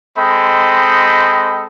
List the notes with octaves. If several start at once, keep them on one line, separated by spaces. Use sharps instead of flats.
G#3 C4 A4 D#5 G5 B5